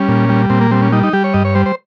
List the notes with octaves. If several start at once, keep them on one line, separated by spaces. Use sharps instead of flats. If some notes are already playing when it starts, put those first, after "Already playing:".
Already playing: G3 C#4
A#2
G3
A#2 C4
A#3
G3 C4
C#4
G3 D#4
D#4
G3 G4
C#5
G2 D#5
C#5
G3 C5
C5